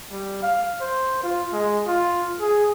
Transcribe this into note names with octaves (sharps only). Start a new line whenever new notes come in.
G3
F5
C5
F4
G#3
F4
G#4